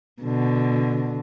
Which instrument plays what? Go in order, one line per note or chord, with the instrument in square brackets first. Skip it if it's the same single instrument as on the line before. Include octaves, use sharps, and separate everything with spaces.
[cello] B2 D3